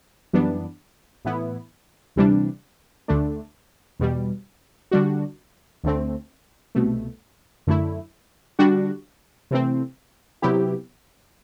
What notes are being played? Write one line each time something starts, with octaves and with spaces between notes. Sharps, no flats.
F#2 E3 G3 B3 D4
A2 E3 B3 E4
D2 C3 E3 G3 D4
D2 D3 A3 D4
E2 B2 G3
D3 G3 D4 F#4
D2 D3 A3 C4
C2 B2 A3
F#2 D3 A3 E4
D3 G3 D4 F#4
C3 E3 A3 C4
C3 F#3 B3 E4 G4